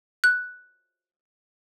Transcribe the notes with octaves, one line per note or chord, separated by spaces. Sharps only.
F#6